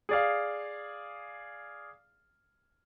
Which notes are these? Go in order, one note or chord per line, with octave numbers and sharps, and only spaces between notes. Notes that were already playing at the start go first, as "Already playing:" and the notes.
G#4 D5 F5